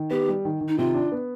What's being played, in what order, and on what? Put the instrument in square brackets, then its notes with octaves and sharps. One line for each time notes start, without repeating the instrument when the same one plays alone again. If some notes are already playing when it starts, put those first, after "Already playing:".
Already playing: [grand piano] D#3
[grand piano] B3 [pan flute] G4
[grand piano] G3
D#3
D#3
[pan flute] D#4
[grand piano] C3 [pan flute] F4
[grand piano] D4
B3